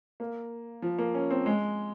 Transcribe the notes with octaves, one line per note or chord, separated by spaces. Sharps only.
A#3
F3
A#3
C#4
C4
G#3